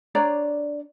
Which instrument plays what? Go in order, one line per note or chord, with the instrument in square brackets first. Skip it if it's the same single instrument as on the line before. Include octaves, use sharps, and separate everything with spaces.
[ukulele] D4 C#5 D5 A#5